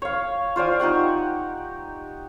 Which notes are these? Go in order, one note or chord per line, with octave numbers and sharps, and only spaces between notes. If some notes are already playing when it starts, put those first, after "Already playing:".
C#5 F5
F4 C5 D5 G#5
D#4 G4 F#5 C#6